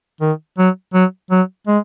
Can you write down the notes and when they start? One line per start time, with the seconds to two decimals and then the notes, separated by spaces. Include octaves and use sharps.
0.21 D#3
0.58 F#3
0.94 F#3
1.31 F#3
1.67 G#3